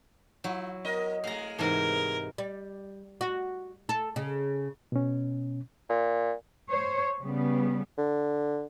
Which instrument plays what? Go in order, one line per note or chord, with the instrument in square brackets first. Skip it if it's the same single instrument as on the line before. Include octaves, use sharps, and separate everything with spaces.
[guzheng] F#3 E4 [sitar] F4
[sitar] B3 A#4 D#5
[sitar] G#3 A3 [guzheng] F5 A#5
[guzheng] G#2 C3 E3 [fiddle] A#4
[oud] G3
F#4
A4
C#3
[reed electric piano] B2 C#4
[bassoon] A#2
[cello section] C5 C#5
C#3 G3 B3
[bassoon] D3